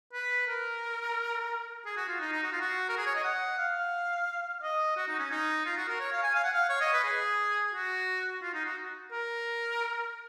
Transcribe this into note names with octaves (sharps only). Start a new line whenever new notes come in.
B4
A#4
G#4
F#4
F4
D#4
D#4
F#4
F4
F#4
A#4
G#4
C#5
D#5
F#5
F5
D#5
F#4
D#4
C#4
D#4
F4
F#4
A#4
C#5
F5
G#5
F5
F#5
F5
C#5
D#5
B4
G#4
F#4
F4
D#4
F#4
A#4